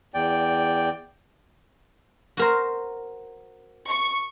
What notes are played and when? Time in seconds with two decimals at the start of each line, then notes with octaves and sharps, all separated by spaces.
0.14 E2 D5 G5
2.37 F#4 A#4 C5
3.90 C#6